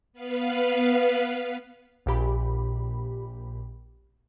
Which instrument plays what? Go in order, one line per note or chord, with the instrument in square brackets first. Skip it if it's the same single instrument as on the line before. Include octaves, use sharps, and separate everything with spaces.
[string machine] B3 B4 F5
[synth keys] A#1 A#2 G4 B5